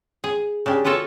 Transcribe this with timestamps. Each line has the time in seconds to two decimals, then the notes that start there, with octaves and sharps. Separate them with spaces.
0.24 G#4
0.66 C#3 D4 G4
0.85 B3 F4 F#4 A4 C#5